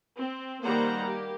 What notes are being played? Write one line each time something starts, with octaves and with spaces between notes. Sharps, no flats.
C4
D#3 G3 A#3 C5 F#5 A#5
A#3 G4